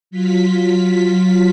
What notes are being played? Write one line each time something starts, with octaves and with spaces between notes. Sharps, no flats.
F#3 F4 B6